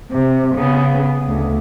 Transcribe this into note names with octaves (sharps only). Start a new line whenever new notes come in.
C3
C#3 B3
D2